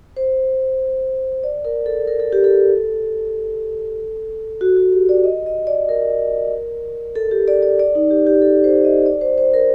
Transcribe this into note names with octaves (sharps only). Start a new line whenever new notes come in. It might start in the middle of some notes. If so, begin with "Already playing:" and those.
C5
D5
A#4
A4
A#4
A4
G4
A4
F#4
F#4
G4
D5
D#5
D#5
D5
A#4
A4
G4
D5
D5
D5
D#4
G4
G4
A4
C5
D#5
D5
C5
C5
A#4